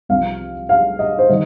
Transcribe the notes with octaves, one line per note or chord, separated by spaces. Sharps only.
C2 C3 F3 F5
F5
D#5
C5
D#3 G3 D#5